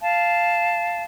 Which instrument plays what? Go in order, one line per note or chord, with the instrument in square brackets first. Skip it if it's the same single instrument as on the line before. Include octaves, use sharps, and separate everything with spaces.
[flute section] F5 A5